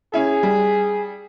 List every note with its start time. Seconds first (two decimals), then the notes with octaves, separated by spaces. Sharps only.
0.14 C#4 E4 G#4
0.43 G3